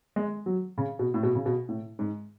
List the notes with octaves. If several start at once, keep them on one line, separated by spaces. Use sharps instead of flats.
G#3
F#3
C#3
B2
A2
B2
C#3
B2
A2
G#2